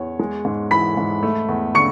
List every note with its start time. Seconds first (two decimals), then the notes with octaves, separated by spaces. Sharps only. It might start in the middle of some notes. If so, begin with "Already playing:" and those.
Already playing: E2 C#5
0.19 G#3
0.45 G#2
0.71 E3 B5 B6
0.97 G#2
1.23 A3
1.48 E2
1.75 D3 C#6 C#7